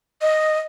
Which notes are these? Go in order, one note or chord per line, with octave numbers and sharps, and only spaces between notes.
D#5